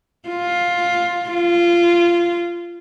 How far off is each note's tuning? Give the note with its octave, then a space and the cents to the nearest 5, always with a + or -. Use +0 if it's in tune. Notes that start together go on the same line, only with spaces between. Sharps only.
F4 +10
F4 -20